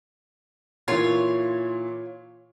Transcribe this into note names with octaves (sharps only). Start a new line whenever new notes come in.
A#2 E3 F4 C#5 C6